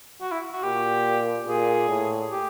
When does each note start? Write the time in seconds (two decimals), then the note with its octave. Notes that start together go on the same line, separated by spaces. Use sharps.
0.21 F#4
0.32 E4
0.52 F#4
0.63 A#2 G4
1.47 A#2 G#4
1.89 A2
2.31 G4